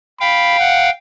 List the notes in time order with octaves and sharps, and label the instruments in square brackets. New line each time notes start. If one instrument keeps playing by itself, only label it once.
[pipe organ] F5 G5 [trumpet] B5
[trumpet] F#5